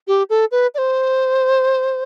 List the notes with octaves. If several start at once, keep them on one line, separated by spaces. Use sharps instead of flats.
G4
A4
B4
D5
C5